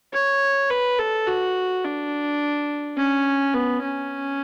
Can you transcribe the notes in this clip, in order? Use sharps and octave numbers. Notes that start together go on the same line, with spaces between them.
C#5
B4
A4
F#4
D4
C#4
B3
C#4